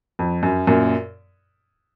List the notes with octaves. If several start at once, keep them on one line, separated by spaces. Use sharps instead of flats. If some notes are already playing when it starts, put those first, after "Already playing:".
F2
F#2
F#2 A#2